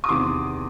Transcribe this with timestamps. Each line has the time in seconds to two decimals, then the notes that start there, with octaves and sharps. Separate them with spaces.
0.04 D#6
0.09 E2 C3 D#3 C6 D6